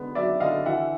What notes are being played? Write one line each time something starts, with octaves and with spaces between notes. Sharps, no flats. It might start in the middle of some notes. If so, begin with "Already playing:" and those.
Already playing: D3 G#3 B3
F#3 D5 E5
D3 D#5 F5
E3 E5 F#5